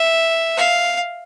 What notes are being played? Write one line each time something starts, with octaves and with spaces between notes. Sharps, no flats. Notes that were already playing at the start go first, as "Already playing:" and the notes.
Already playing: E5
F5